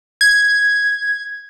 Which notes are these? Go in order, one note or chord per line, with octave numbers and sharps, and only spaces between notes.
G#6